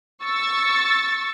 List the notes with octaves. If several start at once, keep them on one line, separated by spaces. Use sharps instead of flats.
C#6 E6 A6